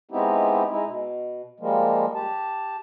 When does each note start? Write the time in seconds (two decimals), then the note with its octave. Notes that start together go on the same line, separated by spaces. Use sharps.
0.11 G#3 B3 C4 D#4 E4 G4
0.70 G#3 D#4 E4
0.86 B2
1.60 F3 G3 G#3 A#3
2.15 G4 A5